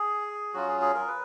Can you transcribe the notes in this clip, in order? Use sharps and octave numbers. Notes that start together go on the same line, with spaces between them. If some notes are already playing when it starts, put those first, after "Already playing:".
Already playing: G#4
F#3 C#4 F4 F#4
G#4
G#4
A#4
B4